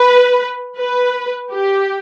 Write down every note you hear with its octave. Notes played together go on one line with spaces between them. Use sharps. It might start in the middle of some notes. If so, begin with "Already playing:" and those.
Already playing: B4
B4
G4